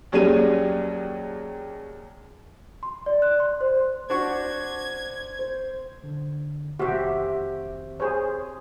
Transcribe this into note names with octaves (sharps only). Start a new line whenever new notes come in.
D#2 F#3 G3 C#4 G#4 D#7
C6
D5
F#6
C6
C5
D4 F#4 C5 C#6 G#6
C5
D3
F1 C3 D#3 F#4 G4 E5
G#4 C5 C#5